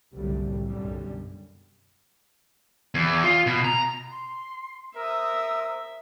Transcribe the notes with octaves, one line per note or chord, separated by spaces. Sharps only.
F#1 C2 A2 D3 F#3 G3
B1 F#2 D3 G3
E2
F4
B2
A#5
C6
A#4 C5 E5 D#6 E6